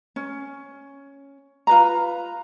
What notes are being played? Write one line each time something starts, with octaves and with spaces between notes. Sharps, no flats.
C#4
F4 B4 A#5